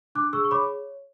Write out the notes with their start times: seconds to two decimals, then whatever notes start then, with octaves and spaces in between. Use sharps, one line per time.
0.15 D4 D6 F#6
0.33 G#4 C#6 E6
0.44 C#6
0.51 C#5 B5 D6